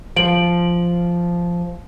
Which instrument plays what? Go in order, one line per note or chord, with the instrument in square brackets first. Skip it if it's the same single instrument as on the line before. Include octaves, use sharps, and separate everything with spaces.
[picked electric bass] F3 [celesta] D7 F#7